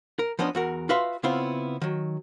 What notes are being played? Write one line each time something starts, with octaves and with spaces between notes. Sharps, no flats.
A#4
F3 B3 C#4 D4 D#5
E2 F#4 A#4
F4 F#4 B4 E5 F5 C6
C#3 B3 C4 E4 F4
D#3 F#3